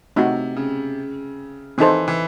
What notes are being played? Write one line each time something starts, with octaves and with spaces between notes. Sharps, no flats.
C3 A3 D#4 F#4
C#3
E3 C4 D#4 A4 C5
E3